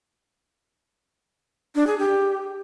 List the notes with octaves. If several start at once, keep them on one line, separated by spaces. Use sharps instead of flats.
D4
G#4
G4